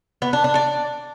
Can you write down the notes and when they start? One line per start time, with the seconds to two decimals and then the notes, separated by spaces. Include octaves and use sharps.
0.22 B3
0.33 D4
0.44 D4
0.55 D5